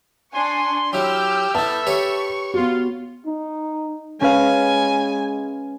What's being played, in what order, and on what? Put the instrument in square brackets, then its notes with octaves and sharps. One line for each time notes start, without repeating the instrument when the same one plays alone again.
[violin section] D4 G#5 C#6 [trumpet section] C6
[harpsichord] F#3 E4 [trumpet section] G4 [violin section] E6 F6 G6
[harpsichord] B3 E4 [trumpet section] A4 E5 [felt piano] A5
[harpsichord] G4 B4 C#5 [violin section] C#6
[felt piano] B3 F#4 [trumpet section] F4
[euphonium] D#4
[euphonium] G#3 [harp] C#4 B4 F5 [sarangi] G#5